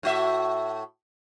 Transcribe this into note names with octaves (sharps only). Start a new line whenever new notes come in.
A2 F#4 E5